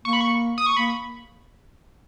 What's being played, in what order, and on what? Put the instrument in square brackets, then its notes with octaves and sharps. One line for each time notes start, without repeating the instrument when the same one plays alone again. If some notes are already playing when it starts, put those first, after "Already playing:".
[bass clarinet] A#3 [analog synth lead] C#6
[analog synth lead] B5
C#6
D#6
C#6
[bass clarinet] A#3 [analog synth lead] B5